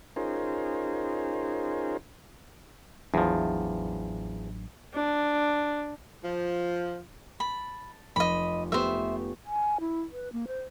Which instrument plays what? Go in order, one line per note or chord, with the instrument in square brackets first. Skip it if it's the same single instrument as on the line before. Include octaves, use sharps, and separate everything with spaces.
[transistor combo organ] C#4 D#4 F4 G#4 A#4 C5
[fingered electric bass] A1 F#3 D4 [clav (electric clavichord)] E2 F3
[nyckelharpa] D4
[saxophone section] F3
[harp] A5 [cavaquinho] B5
[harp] F1 [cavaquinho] D#5 B5
[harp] A3 B3 G4 [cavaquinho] C5 E5
[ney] G#5
E4
B4
A#3
C5